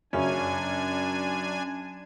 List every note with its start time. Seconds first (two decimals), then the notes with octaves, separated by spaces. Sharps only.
0.13 F#2 C#3 C#4 D4 G#5